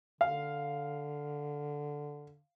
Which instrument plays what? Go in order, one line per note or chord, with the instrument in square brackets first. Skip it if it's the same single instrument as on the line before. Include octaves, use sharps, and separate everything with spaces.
[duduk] D3 [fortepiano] F5